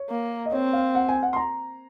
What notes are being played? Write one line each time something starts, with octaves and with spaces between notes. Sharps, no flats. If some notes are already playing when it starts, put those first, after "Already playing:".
Already playing: C#5
A#3
D#5
C4 C#5
F5
F#5
G#5
F#5
C6
A#5